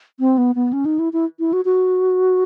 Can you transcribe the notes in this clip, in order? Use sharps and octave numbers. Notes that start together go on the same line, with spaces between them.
C4
B3
B3
C#4
D#4
E4
E4
E4
F#4
F#4